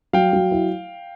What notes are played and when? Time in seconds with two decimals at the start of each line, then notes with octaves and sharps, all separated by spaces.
0.13 F#3 F5 G5
0.33 F#3
0.51 E4